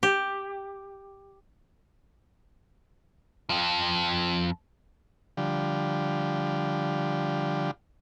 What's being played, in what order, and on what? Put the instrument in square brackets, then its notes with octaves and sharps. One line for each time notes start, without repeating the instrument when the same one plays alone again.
[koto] G4
[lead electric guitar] F2 F3
[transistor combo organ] D3 F3 G3